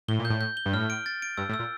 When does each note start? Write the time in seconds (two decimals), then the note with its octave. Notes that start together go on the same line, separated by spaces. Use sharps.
0.08 A2 G7
0.19 A#2
0.25 A2 G6
0.41 G6
0.57 G7
0.66 G2
0.73 A2 F6
0.90 D7
1.06 A6
1.22 D7
1.37 G2 E6
1.49 A2
1.54 E6
1.59 A#2